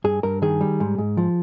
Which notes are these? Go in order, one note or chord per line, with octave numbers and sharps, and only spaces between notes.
G2 G#4
G2 A#4
D#3 G#4
G3
G#2
G#2
F3